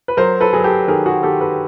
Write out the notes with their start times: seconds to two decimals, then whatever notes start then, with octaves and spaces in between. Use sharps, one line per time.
0.08 B4
0.17 F#3 A#4 C5
0.40 A4 B4
0.53 F#3 G#4
0.64 G4 A4
0.88 D#3 G#4 A#4
1.06 F#4 G#4
1.23 D#3 G4 A4
1.41 A4 B4